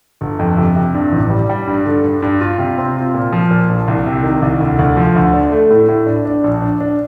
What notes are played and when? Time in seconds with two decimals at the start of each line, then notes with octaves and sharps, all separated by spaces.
0.21 G1
0.39 F2
0.57 C3
0.76 C3
0.94 G2
1.12 A1
1.30 G3
1.50 G3
1.67 G2
1.86 D3
2.04 G2
2.22 G2
2.41 F4
2.58 C3
2.78 C4
2.96 F4
3.14 A#2
3.32 F3
3.51 A#2
3.69 A#1
3.88 C2
4.06 C3
4.23 D#3
4.42 C2
4.60 D2
4.79 D2
4.97 F3
5.16 D2
5.34 D4
5.52 A3
5.70 A2
5.88 A2
6.07 D4
6.25 D4
6.44 A#1
6.62 D4
6.80 D4